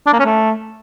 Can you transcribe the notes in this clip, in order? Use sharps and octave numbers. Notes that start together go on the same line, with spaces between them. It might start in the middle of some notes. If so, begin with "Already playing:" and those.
D4
A#3
C#4
A3